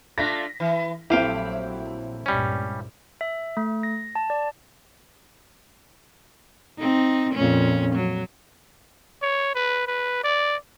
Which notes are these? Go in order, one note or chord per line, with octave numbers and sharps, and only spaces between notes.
A3 D4 F4 A#6 B6
E3
A#1 F#3 A3 C4 E4 G4 F5 G5
C#2 G2 A#2 G3 C#4
E5
A3
A#6
A5
D5
C4 D#4
F2 A#2 C#4
F#3
C#5
B4
B4
D5